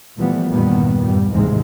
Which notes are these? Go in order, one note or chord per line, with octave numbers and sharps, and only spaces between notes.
A#2 E3 F3 G3 A3 B3
E2 G2 A#2 D#3 G3 B3
G2 G3
A1 D#2 G#2 C3 E3 G#3